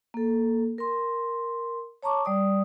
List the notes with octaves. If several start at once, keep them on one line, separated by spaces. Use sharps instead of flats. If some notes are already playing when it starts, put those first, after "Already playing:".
A#3 A4
A#4 C6
C#5 A5 A#5 C#6 D6
G3 D5 D#6